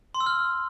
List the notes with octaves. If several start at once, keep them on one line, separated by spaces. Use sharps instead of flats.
C6
E6
F6